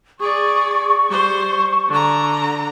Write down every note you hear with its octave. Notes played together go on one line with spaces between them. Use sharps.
G#4 D5 C#6
G3 C5
D3 A#5